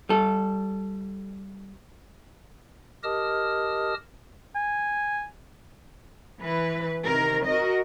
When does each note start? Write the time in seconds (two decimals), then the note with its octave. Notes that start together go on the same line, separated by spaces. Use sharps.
0.09 G3 A4
3.04 G4 A#4 D#5 A5 D#6 F6
4.55 G#5
6.41 E3 B4
7.04 C3 D#3 A#4
7.45 F#4 A#4 D#5